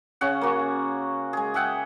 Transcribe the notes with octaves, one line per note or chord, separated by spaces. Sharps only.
C#3 C#4 F#5
A#3 F#4
G#3 G#4
G#4 E5 F#5 G5